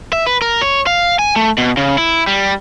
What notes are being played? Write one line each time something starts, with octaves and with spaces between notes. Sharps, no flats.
E5
B4
A#4
C#5
F5
G#5
A3
B2
C#3
E4
G3